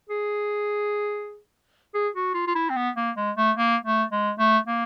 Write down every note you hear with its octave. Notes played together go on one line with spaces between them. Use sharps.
G#4
G#4
F#4
F4
F4
E4
C4
B3
A#3
G#3
A3
A#3
A3
G#3
A3
A#3